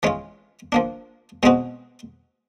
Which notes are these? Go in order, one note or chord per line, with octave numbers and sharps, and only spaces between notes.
E3 G#3 C#4 F4
F3 A#3 D4
B2 G#3 C4 D#4 F#4